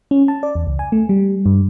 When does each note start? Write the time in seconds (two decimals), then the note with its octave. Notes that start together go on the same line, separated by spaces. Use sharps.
0.11 C#4
0.28 A5
0.43 D5
0.55 E2
0.67 C#2
0.79 G#5
0.92 A3
1.09 G3
1.46 G2